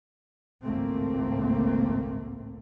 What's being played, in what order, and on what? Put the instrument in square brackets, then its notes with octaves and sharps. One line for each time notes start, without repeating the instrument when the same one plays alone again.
[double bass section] G#1 C#2 A2 A3 A#3 C4